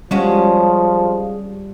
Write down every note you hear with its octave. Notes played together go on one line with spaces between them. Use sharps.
F3 G3 G#3 C#4 F#4